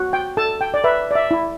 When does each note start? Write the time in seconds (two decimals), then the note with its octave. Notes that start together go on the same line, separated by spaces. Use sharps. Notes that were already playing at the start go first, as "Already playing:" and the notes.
Already playing: F#4
0.13 G5
0.37 A4 A5
0.61 G5
0.74 D5
0.84 B4 E5
1.11 D5
1.15 E5
1.31 E4